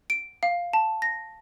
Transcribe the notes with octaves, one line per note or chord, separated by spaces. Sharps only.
D7
F5
A5
A#6